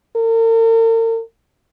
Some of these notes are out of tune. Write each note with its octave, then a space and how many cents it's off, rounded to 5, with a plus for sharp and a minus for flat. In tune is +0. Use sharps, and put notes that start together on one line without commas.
A#4 -45